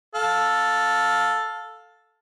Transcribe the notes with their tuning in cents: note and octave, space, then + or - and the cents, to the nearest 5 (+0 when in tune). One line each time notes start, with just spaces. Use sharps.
A4 +0 F5 +20